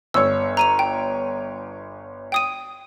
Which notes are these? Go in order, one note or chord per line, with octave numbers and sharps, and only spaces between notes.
G1 C#5 E6
A#5 D#7 F7
G5
G5 D#6 D#7